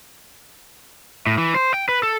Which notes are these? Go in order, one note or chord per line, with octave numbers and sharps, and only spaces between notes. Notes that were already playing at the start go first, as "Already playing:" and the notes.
A2
E3
C5
G5
B4
A4